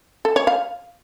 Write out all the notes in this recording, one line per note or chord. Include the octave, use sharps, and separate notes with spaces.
A4
C#5
F5